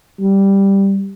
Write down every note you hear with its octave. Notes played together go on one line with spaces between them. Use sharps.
G3